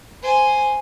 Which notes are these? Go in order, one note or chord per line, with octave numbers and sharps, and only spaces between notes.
C5 G#5